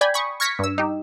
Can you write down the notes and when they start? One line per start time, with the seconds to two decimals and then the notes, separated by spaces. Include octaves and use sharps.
0.01 D5 G5 G#5 B5
0.14 B5 C#6 D#6
0.40 C#6 F6 G#6 A#6 B6 C#7
0.59 G2 E6
0.78 D#4 G4